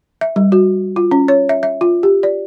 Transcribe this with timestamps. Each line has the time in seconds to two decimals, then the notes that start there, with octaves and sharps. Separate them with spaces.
0.21 E5
0.36 G3
0.52 F#4
0.96 F4
1.11 C#4
1.28 C#5
1.49 E5
1.63 E5
1.81 F4
2.03 G4
2.23 D5